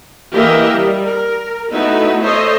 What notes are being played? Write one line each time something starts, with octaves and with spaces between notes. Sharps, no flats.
E3 A#3 G4 A#4 D#5 E5
G3
A#4
A3 B3 D#4 E4 F#4 E5
A4 C5 C#5 D#5 E5